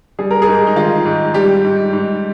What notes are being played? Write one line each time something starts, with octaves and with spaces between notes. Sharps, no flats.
G3 G#4
A#4
G#4
G#2
D#4
D#3 F4
G#2
G3 G4
G#2
G#2